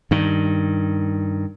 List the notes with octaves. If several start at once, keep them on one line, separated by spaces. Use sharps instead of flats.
G2 D#3